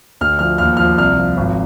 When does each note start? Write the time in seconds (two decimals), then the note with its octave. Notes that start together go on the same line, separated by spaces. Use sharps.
0.21 D2 F6
0.39 F3 F6
0.58 D#2 F6
0.77 F3 F6
0.98 C2 F6
1.17 F3
1.37 G#1